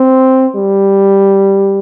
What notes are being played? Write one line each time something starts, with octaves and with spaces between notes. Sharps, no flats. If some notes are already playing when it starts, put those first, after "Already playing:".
Already playing: C4
G3